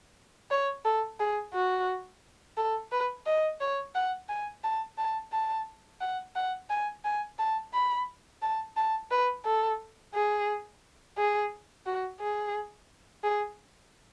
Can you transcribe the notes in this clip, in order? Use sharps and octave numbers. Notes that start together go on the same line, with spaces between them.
C#5
A4
G#4
F#4
A4
B4
D#5
C#5
F#5
G#5
A5
A5
A5
F#5
F#5
G#5
G#5
A5
B5
A5
A5
B4
A4
G#4
G#4
F#4
G#4
G#4